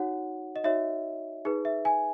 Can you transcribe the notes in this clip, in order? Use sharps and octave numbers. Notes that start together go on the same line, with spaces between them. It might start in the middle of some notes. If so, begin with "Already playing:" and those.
Already playing: D#4 F#4 C#5 F#5
D#5
D#4 F#4 C#5 E5
D#4 G#4 B4
E5
G#5